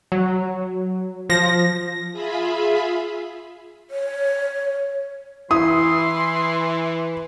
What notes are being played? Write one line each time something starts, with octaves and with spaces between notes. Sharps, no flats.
F#3
F3 A#6
F4 G#4 E5 B5
C#5
E3 E4 C6 D#6